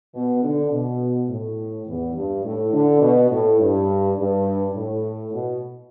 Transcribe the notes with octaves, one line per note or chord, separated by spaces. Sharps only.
B2
D3
B2
A2
E2
G2
A2
D3
B2
A2
G2
G2
A2
B2